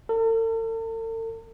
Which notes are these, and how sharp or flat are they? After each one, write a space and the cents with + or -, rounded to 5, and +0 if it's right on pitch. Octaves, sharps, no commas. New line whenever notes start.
A4 +45